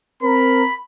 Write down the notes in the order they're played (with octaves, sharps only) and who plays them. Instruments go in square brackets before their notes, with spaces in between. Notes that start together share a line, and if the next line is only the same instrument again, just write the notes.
[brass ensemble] C4 A#4 [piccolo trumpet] B5